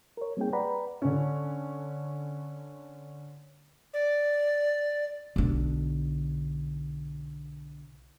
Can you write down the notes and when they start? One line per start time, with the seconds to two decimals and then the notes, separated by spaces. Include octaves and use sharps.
0.17 A#4 C#5
0.37 G3 A#3 C4 D#4 G#4 G5
0.53 B4 D5 F#5 G5 A#5 B5
1.02 D3 C#4
3.94 D5
5.36 B1 D3